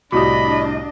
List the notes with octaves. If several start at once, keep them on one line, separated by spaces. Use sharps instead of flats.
C2 A2 D4 F#4 G4 D#5 B5